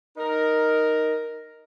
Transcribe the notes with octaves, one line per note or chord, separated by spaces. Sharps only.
D#4 A#4